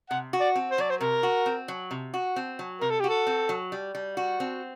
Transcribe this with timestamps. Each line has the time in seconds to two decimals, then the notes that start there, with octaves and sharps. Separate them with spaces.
0.10 C3 F#5
0.33 F#4
0.40 D5
0.55 C4
0.71 C5
0.78 F#3 D5
0.90 C5
1.01 C3 A#4
1.23 F#4
1.46 C4
1.68 F#3
1.91 C3
2.14 F#4
2.36 C4
2.59 F#3
2.81 C3 A#4
2.90 A4
3.00 F#4 G4
3.09 A4
3.27 C4
3.49 F#3
3.72 G3
3.95 G3
4.17 F#4
4.40 C4